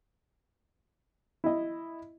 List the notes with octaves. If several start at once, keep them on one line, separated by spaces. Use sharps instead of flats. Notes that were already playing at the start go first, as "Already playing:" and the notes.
E4 D#5